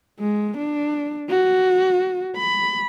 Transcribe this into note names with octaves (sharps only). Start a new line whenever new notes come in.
G#3
D4
F#4
B5